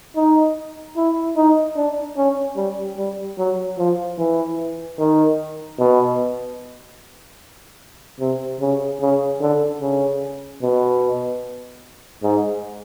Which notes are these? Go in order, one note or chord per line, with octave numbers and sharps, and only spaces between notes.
D#4
E4
D#4
D4
C#4
G3
G3
F#3
F3
E3
D#3
B2
C3
C#3
C#3
D3
C#3
B2
G#2